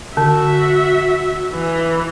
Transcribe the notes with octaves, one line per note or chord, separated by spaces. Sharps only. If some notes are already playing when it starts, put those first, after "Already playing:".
D3 F#4 E5
E3